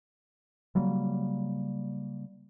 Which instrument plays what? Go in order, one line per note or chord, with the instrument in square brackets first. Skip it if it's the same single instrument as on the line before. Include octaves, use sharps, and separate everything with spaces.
[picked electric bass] C#3 F#3 G3 A#3